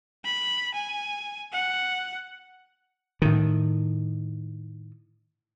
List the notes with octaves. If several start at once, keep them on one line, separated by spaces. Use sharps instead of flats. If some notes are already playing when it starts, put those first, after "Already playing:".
B5
G#5
F#5
A2 D#3